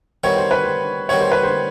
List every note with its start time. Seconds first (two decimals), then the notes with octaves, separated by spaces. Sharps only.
0.24 D#3 G3 B3 E4 C#5
0.37 C5
0.51 B4
0.63 C5
1.09 D#3 G3 B3 E4 C#5
1.21 C5
1.32 B4
1.43 C5